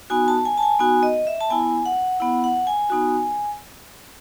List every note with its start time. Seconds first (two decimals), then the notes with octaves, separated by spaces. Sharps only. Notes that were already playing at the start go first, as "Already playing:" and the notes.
0.10 B3 D#4 F#4 G#5
0.28 A5
0.45 G#5
0.58 A5
0.63 G#5
0.79 B3 D#4 F#4 G#5
1.03 D#5
1.27 E5
1.40 A5
1.50 B3 E4 G#5
1.86 F#5
2.20 B3 E4 F#5
2.44 F#5
2.67 G#5
2.90 B3 D#4 F#4